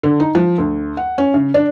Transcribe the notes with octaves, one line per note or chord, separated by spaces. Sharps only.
D3
D#4
F3
D2
F#5
C#4
C#3
D4